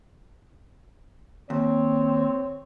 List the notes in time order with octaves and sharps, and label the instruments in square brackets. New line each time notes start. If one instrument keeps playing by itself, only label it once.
[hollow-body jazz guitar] D#2 [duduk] C4 [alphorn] C#5